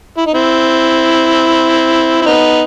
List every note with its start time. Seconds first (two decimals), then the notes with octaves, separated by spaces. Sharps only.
0.17 E4
0.26 D#4
0.34 C4 E4
2.22 E4
2.26 B3 D#4